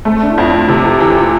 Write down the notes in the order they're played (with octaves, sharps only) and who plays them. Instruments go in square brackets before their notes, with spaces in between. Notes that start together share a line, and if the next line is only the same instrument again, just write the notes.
[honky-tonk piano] A3 [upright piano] C4
[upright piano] D4
E4
[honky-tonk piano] F2 [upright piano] F4
[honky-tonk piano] C3 [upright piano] F4
[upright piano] G4
[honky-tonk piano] E3 [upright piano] G4
[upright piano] F4